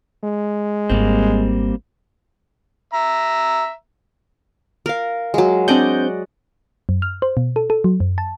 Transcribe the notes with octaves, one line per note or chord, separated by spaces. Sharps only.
G#3
G#1 G3 A#3 C4 D4
E5 A#5
A#4 F5
F#3 G#3
C4 D4 D5 D#5 F#5 G6
F#2
F6
C5
B2
A4
A4
F#3
F#2
A5